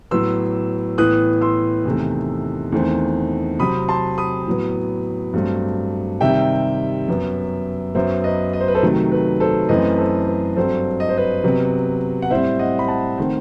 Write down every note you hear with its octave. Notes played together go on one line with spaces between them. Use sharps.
A2 F#3 B3 C6 E6
A2 E3 B3 D#6 F#6
C6 E6
E2 C3 D#3 A3
E2 D#3 A3 C4
C3 F#3 C4 B5 D#6
A5 C6
B5 D#6
A2 F#3 B3
G2 F#3 A3 C4
C3 D#3 G3 E5 G5
F#2 F#3 B3
F#2 F#3 B3 C5 E5
B4 D#5
D#5
C5
B4
A4 C5
C3 D#3 F#3 A3
B4
A4 C5
F#2 E3 A3 C4 B4 D#5
A4 C5
B4
G2 F#3 C4 A4 C5
D#5
C5
B4 D#5
C3 F#3 B3
F#5
A2 G3 C4 C5 E5
D#5 F#5
B5
F#5 A5
D#3 A3 C4